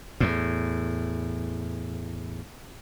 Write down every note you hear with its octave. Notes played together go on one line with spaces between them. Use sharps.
E2 A2